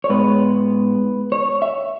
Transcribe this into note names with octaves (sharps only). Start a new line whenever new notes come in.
C#5
G#2 G#3 B3 B4
C#5
E5